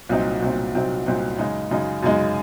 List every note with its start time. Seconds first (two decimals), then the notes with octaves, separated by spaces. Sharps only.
0.09 C2 A#2 F#3 C4 D#4
0.42 C2 A#2 F#3 C4 D#4
0.75 C2 A#2 F#3 C4 D#4
1.06 C2 A#2 F#3 C4 D#4
1.38 F#2 C#3 G#3 D#4
1.71 F#2 C#3 G#3 D#4
2.03 F#2 C#3 G#3 D#4